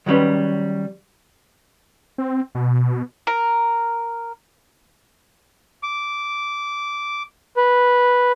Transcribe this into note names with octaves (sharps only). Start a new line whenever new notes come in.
D#3 F#3 G3 C#4 B4
C4
B2
A#4
D6
B4